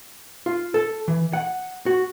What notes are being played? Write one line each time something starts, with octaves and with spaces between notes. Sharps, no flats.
F4
A4
E3
F#5
F#4